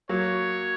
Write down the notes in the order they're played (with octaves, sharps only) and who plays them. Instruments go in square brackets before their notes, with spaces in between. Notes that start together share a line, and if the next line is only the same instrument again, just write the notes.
[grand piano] F#3 A#3 [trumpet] C#5